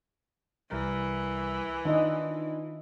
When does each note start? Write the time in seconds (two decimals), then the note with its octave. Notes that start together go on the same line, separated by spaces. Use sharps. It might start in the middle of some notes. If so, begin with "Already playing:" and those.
0.71 C2 E3 G3 A#4
1.85 D#3 D4 D#4 F4 D#5